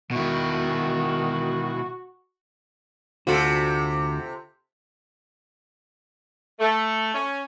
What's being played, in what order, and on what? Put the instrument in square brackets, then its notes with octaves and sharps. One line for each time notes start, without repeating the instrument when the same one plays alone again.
[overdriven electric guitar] B2 E4 [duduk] D#3 [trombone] F#4
[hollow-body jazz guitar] D2 F#4 [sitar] C3 F4 A4
[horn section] A3
C#4